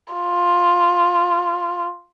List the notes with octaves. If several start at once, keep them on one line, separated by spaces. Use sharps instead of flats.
F4